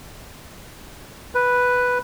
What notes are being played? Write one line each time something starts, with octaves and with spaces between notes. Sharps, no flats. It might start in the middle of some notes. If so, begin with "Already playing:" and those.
B4